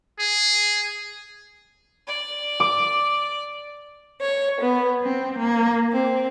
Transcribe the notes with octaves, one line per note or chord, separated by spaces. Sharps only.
G#4
D5
D6
C#5
B3
C4
A#3
C4